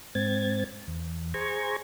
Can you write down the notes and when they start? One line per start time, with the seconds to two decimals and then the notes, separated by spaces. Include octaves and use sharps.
0.15 G#2 C4 G#6 A6
0.87 E2
1.34 G#4 C5 A#5 C#6 G#6